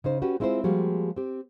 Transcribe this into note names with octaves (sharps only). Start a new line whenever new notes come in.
C#3 D#4 C5
C#4 F#4 G4 B4
G#3 C4 E4 F4 C5
F3 G3 G#3 A#3 F#4 G4
C4 G4